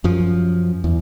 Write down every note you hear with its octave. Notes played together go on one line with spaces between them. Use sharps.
F#2 F3
E2